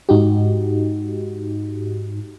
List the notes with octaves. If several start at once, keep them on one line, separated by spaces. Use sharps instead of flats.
G#2 D#4 F#4 G4